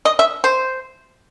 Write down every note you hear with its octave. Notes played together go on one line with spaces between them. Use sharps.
D#5
E5
C5